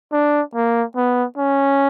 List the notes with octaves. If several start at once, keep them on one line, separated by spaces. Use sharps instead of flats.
D4
A#3
B3
C#4